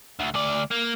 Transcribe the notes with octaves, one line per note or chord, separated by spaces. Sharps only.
D2
D2 D5
A#3